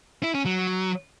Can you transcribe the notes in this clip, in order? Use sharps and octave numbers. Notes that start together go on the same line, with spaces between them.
E4
C#4
F#3